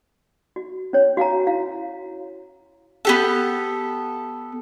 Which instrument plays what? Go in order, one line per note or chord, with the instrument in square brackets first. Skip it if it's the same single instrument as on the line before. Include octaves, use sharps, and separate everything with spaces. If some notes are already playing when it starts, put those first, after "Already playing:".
[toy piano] F#4
C#4 C#5
F#4 F5 G#5 A#5
E4 F5
[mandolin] B3 G4 A4